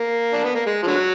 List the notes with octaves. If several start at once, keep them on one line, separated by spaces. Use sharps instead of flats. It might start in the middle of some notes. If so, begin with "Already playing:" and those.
Already playing: A#3
D4
B3
A#3
G#3
F3
D3 F#3